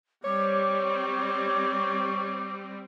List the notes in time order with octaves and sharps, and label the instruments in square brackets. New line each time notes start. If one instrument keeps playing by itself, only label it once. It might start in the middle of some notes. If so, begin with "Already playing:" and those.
[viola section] G3 C4 [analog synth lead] C#5 [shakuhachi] D6